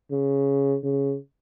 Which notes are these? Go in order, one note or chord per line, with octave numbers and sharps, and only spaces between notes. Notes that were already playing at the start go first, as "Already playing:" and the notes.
C#3
C#3